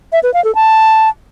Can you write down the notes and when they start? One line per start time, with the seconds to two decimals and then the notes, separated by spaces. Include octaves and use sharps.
0.12 E5
0.23 B4
0.34 F5
0.44 A4
0.55 A5